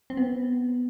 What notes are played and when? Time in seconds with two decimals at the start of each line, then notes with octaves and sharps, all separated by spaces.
0.10 C4
0.17 B3